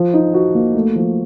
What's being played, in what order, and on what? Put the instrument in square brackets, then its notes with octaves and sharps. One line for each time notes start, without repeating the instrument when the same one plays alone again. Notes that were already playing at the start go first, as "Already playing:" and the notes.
Already playing: [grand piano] F3
D#4
F#4
A#3
A3
F3